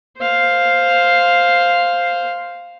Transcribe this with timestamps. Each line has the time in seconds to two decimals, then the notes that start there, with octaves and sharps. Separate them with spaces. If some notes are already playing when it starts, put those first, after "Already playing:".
0.18 C5 F5